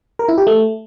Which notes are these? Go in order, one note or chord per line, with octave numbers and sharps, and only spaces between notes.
A#4
E4
G4
A3